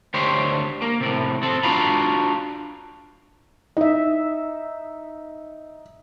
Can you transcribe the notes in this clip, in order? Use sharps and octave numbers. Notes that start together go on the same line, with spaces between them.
D2 G4 C5 C#5
A#3
A2 C3
C4 A4
D4 F4 F#4 F5 A#5 B5
D#4 D#5 E5